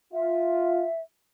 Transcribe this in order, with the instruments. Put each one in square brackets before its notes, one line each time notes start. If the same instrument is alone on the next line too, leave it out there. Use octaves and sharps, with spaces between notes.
[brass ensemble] F4 [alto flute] E5